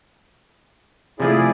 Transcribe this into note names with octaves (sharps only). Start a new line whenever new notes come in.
C3 F3 A3 E4 G#4 D5